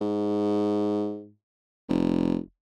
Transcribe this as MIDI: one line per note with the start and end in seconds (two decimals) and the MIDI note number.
0.01 1.31 44
1.89 2.37 29